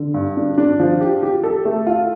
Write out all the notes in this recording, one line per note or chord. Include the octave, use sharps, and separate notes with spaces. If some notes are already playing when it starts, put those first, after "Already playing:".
Already playing: D3
G2
D4
D4
F3
G4
G4
A4
A3
F4